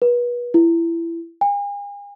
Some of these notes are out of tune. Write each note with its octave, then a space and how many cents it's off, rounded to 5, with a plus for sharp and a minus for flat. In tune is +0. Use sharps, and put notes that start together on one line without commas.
B4 -35
E4 +25
G#5 -45